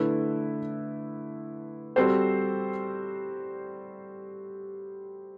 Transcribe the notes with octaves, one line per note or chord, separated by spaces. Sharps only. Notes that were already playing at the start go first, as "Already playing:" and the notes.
Already playing: D3 A3 E4 B4
G3 C4 F#4 A4 C5